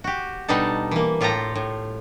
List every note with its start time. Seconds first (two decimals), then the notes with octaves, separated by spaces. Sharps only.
0.04 F#4 G4
0.48 B2 G3 D4 D#4 A4 A5
0.91 E3 A#3
1.21 A2 F4 G4 A4 A#5
1.55 A2